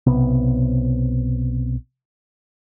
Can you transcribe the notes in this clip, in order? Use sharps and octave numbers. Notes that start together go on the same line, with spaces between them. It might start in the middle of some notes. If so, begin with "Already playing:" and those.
B1 C3 B3